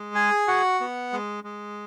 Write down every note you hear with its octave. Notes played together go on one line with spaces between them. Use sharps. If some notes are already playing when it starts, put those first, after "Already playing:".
Already playing: G#3
G#4 G#5
F#4 F#5
B3
G#3
G#3